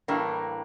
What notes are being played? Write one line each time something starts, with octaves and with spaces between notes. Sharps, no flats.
A2 E3 G3 A#3 D4